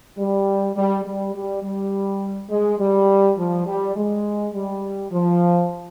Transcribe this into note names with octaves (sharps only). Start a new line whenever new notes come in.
G3
G3
G3
G3
G3
G#3
G3
F3
G3
G#3
G3
F3